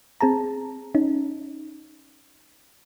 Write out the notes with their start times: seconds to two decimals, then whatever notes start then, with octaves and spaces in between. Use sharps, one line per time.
0.21 C4 G#4 A5 A#5
0.95 C#4 D#4